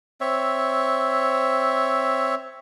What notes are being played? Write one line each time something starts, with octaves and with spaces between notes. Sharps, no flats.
C4 C#5 E5